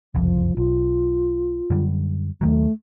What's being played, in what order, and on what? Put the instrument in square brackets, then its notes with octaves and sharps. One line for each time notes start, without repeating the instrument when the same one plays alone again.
[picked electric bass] F#1 C2 F2 [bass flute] F3
[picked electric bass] B1 [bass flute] F4
[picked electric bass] F#2 D3 G3
[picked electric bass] D#2 D#3 F#3 [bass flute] A3